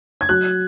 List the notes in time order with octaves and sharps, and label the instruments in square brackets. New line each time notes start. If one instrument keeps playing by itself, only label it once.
[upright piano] G#6
F#3 F#6